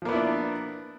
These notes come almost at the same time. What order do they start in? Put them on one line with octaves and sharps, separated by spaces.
F3 A#3 B3 E4 D4